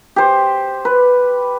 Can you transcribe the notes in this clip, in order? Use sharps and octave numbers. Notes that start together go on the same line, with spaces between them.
G4 C5
B4